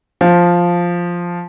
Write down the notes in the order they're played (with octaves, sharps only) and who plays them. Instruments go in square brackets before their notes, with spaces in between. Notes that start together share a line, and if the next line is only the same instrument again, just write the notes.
[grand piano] F3